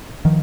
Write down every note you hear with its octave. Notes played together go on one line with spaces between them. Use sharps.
D#3 F3